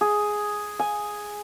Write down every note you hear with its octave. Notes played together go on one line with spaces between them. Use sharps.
G#4
G#5